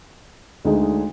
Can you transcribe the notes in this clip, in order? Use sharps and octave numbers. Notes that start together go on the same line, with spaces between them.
D2 D3 G#3 D#4